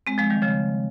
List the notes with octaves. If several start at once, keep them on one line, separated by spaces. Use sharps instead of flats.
G#3 C4
F3 G#3
D#3 G3
C#3 F3